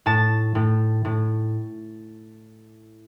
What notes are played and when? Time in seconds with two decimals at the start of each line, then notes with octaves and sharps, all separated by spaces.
0.06 A2 A5
0.55 A2
1.05 A2